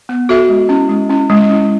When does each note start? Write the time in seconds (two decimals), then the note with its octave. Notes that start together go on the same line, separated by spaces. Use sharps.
0.09 B3
0.29 F#4 A4 E5
0.49 G#3
0.69 C#4 E4
0.89 G#3
1.09 C#4 E4
1.29 G#3
1.49 C#4 E4